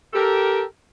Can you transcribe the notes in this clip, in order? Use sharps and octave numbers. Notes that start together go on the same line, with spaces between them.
G4 A4 A#4